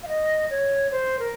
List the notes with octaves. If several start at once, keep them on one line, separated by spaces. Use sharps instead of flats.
F5
D#5
C#5
C5
A#4